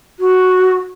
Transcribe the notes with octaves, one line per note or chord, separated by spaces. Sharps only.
F#4